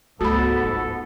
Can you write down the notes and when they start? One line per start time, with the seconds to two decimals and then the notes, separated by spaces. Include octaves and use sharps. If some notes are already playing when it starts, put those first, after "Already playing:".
0.21 C#2 G#2 A3 B3 F#4 A4 B5
0.64 D#4 F4